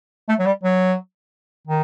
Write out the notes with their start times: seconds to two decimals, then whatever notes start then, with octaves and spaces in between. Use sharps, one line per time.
0.29 A3
0.39 F#3
0.46 G3
0.63 F#3
1.67 D#3